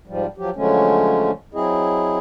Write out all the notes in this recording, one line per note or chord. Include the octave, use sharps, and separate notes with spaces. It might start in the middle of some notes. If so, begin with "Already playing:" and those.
G#2 F3 G3
F3 F#3 G4
D3 F3 F#3 G#3 A3 C#4
F#3 C4 E4 G#4 D#5